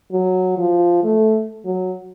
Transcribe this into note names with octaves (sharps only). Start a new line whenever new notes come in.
F#3
F3
A3
F#3